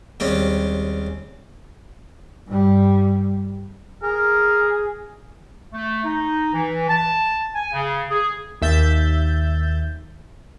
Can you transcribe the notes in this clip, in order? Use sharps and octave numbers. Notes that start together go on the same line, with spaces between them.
D#2 G3 G#3 C4 C#4
G2 G3
G#4 A#4
A3
D#4
E3
A5
G#5
C#3
G#4
D#2 E5 G6 A6